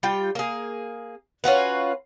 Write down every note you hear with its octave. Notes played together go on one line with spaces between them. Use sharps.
G3 F4 G5
A#3 G#4
C#4 F4 F#4 B4